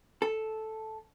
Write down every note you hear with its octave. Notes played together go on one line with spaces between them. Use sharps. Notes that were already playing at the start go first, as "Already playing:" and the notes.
A4